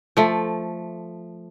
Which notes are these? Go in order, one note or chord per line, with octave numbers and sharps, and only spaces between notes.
F3 A3